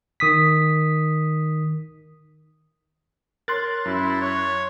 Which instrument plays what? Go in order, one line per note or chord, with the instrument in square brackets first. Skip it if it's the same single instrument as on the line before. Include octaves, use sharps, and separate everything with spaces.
[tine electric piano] D#3 D#6 B6
[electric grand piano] A#4 C#5 [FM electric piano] C6 F#6 A6
[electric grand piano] F#2 [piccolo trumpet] E4
[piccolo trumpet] C#5